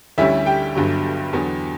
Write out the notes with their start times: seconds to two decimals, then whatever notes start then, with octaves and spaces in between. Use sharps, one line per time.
0.18 D2 D3 G3 C#4 E4 E5
0.46 G4 G5
0.75 G1 G2 D3 F#3
1.33 E2 D3 F#3 B3